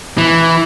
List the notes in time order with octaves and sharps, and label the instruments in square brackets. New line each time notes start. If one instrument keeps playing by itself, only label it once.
[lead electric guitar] E3